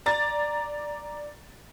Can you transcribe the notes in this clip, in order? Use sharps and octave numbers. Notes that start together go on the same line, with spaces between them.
D5 A#5 A6